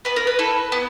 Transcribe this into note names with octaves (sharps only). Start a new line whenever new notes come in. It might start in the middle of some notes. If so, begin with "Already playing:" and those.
B3 B4
A#4
B4
E4 A4
B3